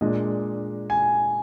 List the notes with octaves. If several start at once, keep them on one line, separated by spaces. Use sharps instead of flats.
A#2 G#3 D4 D#5
G#5